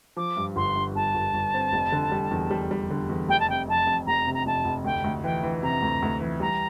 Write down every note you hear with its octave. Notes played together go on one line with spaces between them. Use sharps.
F3 D6
G2
G1 C6
G2
G1 A5
G1
G1
C4
F1
D3
G3
E2
G3
G3
D3
E2
F1 G5
A5
C3 G5
F2 A5
F2
F1 A#5
C3
A#5
F1 A5
F1
D2 G5
D2
E3 G5
E3
C3 A#5
D2
D2
E3
G3 A#5